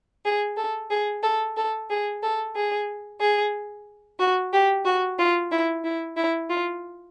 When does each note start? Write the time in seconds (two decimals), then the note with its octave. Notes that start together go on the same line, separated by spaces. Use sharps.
0.25 G#4
0.57 A4
0.90 G#4
1.23 A4
1.57 A4
1.89 G#4
2.22 A4
2.55 G#4
3.20 G#4
4.19 F#4
4.53 G4
4.85 F#4
5.18 F4
5.51 E4
5.84 E4
6.17 E4
6.49 F4